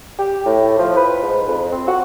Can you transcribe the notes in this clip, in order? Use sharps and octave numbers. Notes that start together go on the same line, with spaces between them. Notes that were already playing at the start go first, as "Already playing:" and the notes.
G4
A2
F3
B4
G#2
F2
C4
F#4